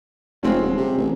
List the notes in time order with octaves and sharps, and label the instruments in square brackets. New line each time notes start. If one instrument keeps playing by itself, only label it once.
[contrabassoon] F1 [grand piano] G#3 C4 C#4
[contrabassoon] D#1
C3
A1